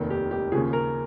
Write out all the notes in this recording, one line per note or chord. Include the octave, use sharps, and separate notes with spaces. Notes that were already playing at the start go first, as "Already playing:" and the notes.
Already playing: F1 D#2 D#3
G4
G4
D#2 C#3 F3 G#4
A#4